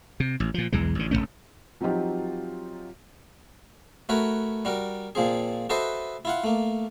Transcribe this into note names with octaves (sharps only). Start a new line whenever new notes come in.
C3
A1
A#2 F3
B1 E2 E3 G#3
A1 D3
E1 G2 A3 C#4
F3 F#3 C4 D#4 F4 G4
A3 F#4 A#4 B4 C#5
G3 F#4 A#4
A#2 F3 C4 G#4
F#4 A4 B4 C5 D#5 E5
E4 F4 F#5
A3 A#3